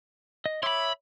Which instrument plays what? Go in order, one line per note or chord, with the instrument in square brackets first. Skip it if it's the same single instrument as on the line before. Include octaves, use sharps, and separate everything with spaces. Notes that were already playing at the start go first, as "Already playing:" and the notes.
[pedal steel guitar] D#5
[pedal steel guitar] C#5 E5 D6 [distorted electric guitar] B5 C6